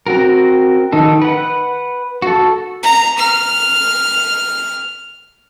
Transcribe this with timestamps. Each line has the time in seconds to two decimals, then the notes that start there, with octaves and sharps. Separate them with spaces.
0.07 C4 F#4 A#4
0.92 D#3 D#4 A4
1.22 B4 F#5
2.22 F#4 A4
2.83 A#5
3.18 F6